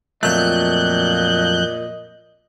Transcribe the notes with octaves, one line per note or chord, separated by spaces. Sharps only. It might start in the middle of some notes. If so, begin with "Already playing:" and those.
F2 A#2 F#3 A3 D#5 F#6 G6